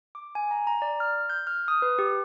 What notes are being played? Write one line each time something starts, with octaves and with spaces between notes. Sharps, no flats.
D6
G#5
A#5
A#5
D5
F6
G6
F6
D#6
B4
G4